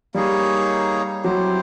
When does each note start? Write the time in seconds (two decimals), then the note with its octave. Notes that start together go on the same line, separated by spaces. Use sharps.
0.14 G3 A#3 D#4 G#4 C#5
1.24 F#3 C4 E4 G4 C5